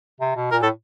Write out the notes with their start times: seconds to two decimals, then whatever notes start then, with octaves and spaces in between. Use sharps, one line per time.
0.20 C3
0.36 B2
0.52 A#2 A#4
0.62 A2 A4